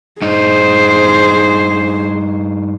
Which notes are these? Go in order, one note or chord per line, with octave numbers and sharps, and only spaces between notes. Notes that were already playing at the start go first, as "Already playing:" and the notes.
G2 D#4 G#4 C5